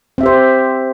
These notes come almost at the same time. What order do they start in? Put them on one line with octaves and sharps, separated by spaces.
C4 E5 G4 C5